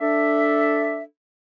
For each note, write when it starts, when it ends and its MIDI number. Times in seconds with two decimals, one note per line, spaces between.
0.01 1.02 62
0.01 1.02 69
0.01 1.02 76